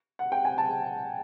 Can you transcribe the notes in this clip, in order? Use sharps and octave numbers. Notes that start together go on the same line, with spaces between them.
F#5
G5
G#5
A5